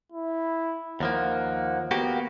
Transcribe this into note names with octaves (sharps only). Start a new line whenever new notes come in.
E4
D#2 F3 A#3 F#5
A#3 B3 F#4 G4